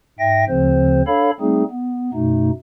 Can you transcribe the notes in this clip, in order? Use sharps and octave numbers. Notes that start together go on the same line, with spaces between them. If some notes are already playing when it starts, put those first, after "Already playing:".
G#2 E5 G5 A#6
D2 C#3 F3 C4 C5
D4 A4 C#5 F5 B5
G3 A3 C4 D#4 G#4
B3
F#2 B2 A3 D#4